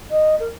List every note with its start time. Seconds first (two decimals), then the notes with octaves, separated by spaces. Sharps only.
0.11 D#5
0.40 A#4